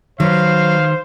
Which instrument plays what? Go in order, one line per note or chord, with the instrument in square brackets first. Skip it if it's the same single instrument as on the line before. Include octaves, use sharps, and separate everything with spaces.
[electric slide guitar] D#3 B4 [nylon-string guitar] F#3 [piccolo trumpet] C5 [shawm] F5